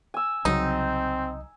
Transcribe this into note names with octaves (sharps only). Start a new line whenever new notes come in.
G#5 E6
C2 C#3 F#3 C4 D#4